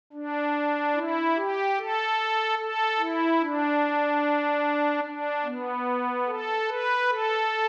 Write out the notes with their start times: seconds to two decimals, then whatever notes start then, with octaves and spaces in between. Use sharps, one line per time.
0.13 D4
0.95 E4
1.36 G4
1.77 A4
2.59 A4
2.99 E4
3.40 D4
5.04 D4
5.45 B3
6.27 A4
6.68 B4
7.09 A4